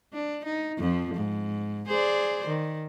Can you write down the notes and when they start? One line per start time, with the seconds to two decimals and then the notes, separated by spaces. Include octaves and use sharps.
0.13 D4
0.45 D#4
0.78 F2 F3
1.14 G#2
1.87 G#4 C5 D5
2.47 D#3